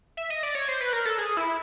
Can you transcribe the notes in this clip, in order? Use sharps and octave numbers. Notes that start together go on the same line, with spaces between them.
E5
D#5
D5
C#5
C5
B4
A#4
A4
G#4
E4